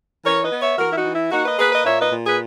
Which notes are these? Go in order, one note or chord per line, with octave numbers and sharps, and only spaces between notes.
E3 A#4 C#5
B4 D#5
B3
C#5 E5
E3 F#4 A#4
E4
D#4 F#4
E3
E4
A#3 D#4 F#4
B4 D#5
A#3 G#4 B4
B4 D#5
A#2 C#5 E5
B4 D#5
A#2
G#4 B4